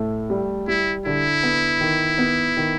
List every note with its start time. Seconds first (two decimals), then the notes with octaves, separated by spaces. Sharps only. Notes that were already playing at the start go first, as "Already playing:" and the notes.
Already playing: A2 A3
0.30 G3
0.68 G3 E4
1.06 D3 E4
1.43 B3
1.81 D#3
2.18 B3
2.57 D#3